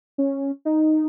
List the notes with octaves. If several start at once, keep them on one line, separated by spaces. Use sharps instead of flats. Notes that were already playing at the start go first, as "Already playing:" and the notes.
C#4
D#4